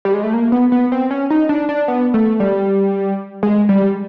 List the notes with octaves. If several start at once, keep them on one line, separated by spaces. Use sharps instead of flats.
G3
G#3
A3
A#3
B3
B3
C4
C#4
D#4
D4
D4
B3
A3
G3
G#3
G3